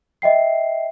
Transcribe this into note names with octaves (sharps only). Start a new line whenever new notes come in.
D#5 E5 G5 C7